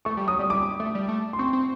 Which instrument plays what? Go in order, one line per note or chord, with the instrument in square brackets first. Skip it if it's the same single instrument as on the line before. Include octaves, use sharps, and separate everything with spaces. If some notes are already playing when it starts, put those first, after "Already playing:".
[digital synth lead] A3 [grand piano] C#6
[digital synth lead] G3
[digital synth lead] F#3 [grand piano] D#6
[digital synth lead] G3
[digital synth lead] G3 [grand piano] D6
[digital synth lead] A3
G3
A3
[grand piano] C6
[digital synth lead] C4 [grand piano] C#6
[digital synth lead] C4